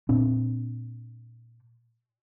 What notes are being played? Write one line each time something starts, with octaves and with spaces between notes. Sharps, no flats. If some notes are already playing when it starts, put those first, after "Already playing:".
A#2 C4 D4